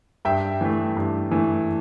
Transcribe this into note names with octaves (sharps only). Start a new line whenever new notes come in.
G2 E5 G5
E3 A3
G2
E3 A3